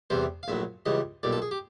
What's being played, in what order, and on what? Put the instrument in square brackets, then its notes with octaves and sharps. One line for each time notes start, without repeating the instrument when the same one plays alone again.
[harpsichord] E2 C3 E3 G3 C5
F5
A#1 A2 F#3 E5
C#2 C#3 E3 G3 D#5
B1 A#2 G3 D5
A4
G#4
G4